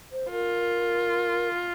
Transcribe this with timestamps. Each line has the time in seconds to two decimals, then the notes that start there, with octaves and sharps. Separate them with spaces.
0.12 C5
0.31 F4 A#4